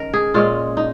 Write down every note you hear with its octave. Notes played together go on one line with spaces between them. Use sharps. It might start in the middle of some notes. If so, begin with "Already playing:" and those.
Already playing: D#3 C#4 A#4
G#4
A#2 G#3 C#4 F4
D#4